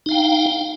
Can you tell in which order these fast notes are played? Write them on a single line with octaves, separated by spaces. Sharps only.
D#4 F5 G5